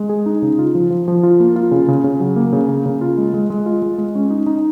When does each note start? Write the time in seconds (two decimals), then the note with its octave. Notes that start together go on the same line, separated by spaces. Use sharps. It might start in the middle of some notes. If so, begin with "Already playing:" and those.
Already playing: G#3
0.09 G#4
0.26 D#4
0.42 C#3
0.59 F4
0.75 F3
0.90 F3
1.08 F3
1.23 F4
1.40 A#3
1.56 F4
1.71 C#3
1.88 C#3
2.04 C#3
2.20 F#3
2.36 A#3
2.53 C#3
2.69 A#3
2.86 C#3
3.01 F4
3.18 G#3
3.34 G#3
3.50 G#3
3.66 F4
3.82 G#3
3.98 G#3
4.15 C#4
4.30 D#4
4.46 D#4